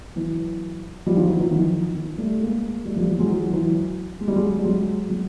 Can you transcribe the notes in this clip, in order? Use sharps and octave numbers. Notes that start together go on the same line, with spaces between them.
E3 F#3
F3 G3
D#3 F3
E3 F#3
E3 F#3
D#3 F3
D#3
G3 A3
G#3 A#3
G3 A3
F3 G3
E3 F#3
F#3 G#3
E3 F#3
E3 F#3
G#3
G3
F#3 G#3
G3
F#3 G#3
F#3 G#3